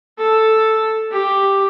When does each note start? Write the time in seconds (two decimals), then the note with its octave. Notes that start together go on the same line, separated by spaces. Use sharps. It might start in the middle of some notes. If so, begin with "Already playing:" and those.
0.18 A4
1.11 G4